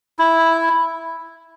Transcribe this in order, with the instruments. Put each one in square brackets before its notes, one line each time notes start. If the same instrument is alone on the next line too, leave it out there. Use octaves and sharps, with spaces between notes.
[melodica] E4